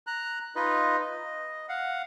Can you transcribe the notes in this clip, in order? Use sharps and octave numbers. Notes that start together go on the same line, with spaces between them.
A#5 F#6
D#4 F4 B4 D#5
D#5
F5 F#5